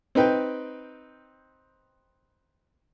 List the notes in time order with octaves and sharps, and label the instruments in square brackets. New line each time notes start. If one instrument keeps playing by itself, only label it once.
[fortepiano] C4 D#4 B4 G5